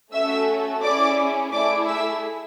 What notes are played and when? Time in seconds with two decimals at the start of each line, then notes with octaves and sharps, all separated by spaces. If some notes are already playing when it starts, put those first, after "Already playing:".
0.13 A3 C#4 F#4 A4 E5 E6
0.82 C#4 E4 G#4 D5 D6
1.52 A3 E4 G#4 D5 D6
1.88 E5 E6